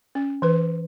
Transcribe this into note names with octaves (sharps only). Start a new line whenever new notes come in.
C#4
E3 B4